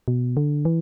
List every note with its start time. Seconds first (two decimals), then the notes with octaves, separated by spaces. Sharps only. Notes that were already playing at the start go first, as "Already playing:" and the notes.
0.08 B2
0.37 D3
0.65 E3